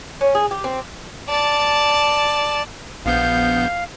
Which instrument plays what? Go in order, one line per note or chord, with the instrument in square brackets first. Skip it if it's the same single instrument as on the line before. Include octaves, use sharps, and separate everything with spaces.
[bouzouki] C#4
G#4
G4
C4
[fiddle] D5 A5
[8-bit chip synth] A#1 B3 G6 [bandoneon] F5